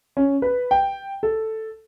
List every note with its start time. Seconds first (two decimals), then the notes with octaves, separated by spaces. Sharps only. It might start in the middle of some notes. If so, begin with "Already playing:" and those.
0.17 C#4
0.42 B4
0.71 G5
1.23 A4